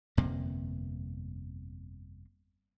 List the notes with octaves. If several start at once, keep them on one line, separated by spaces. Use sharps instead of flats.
G1 F2 C3 A#3